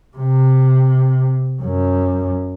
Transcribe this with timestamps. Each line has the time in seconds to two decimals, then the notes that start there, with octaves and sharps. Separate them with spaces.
0.17 C3
1.62 F#2